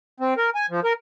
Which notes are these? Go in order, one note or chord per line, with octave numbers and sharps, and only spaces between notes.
C4
A#4
G#5
F3
A#4